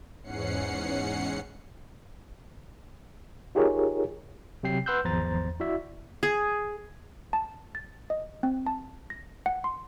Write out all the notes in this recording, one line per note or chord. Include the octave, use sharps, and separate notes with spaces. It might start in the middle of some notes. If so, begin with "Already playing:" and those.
E2 G#2 C#4 F#5 C7 C#7
D#4 F4 G4 G#4 A#4 C#5
C3 F#3 G5 C7
B4 F#5 C6 E6 F#6 G6
G#1 E2 F3 C5 A#5 A6
E4 F#4 D5 E5
G#4
A5
A6
D#5
C4
A5
A#6
F#5
C6